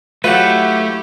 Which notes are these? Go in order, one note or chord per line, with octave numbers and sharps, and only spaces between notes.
F#3 A3 E4 F4 G4 B4 F#5